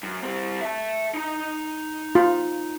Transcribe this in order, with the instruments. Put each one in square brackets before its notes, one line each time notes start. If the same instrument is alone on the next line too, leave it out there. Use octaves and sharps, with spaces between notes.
[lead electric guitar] F#2
G3 C4
E5 A5
D#4 A#5
[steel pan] F4